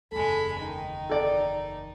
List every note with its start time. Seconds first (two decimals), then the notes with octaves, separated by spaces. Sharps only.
0.12 F#1 E2 G#3 A4 B5
0.60 D#3 D#4
1.10 A4 D5